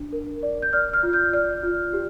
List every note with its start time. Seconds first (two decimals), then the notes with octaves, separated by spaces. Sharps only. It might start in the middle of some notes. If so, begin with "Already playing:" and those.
Already playing: D4
0.12 A#4
0.43 D5
0.62 G6
0.73 D5 F6
0.94 F6
1.03 F4
1.13 G6
1.33 D5 F6
1.63 F4
1.93 G4